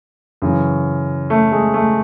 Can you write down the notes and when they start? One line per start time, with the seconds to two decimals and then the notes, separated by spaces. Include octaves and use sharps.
0.42 F#2 C#3 E3
1.30 A3
1.52 G#3
1.74 A3